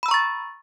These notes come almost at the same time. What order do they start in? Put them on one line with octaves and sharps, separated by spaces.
B5 E6 A#5 C#6 A6